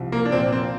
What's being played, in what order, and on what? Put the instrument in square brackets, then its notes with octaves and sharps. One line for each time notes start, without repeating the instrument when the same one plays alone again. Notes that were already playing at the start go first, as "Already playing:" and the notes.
Already playing: [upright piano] C2 C3 F3
[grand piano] A#3
D4
[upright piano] A#2 F3 A#3 F4 [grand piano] C4
[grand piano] C4